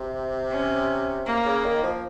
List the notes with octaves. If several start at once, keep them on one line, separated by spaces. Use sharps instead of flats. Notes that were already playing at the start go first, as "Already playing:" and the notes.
Already playing: C3
C#4
A#3
C#3
D#3
F3